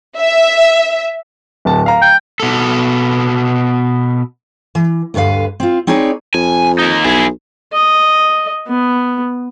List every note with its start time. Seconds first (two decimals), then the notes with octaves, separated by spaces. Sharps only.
0.17 E5
1.65 D1 A5
1.86 F5 A#5
2.02 G5
2.40 B2 A4
4.75 E3
5.14 D2 G2 D3 B4 F5
5.60 C4 F4
5.87 C4 D#4 G#4 B4 C#5 D5
6.34 F2 G#5
6.79 A#3 D#4
7.04 B1 E4 G#4
7.73 D#5
8.67 B3